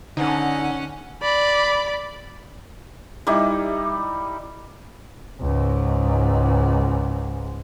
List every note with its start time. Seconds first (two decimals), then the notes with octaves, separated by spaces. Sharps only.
0.17 D3 C#4 D#4 F#5
1.22 D5 B5
3.27 G3 D#4 E4 D6
5.41 C#2 G#2